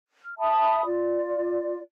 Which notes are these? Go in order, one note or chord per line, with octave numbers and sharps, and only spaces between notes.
F6
E5 A5 B5 D#6
F4 D5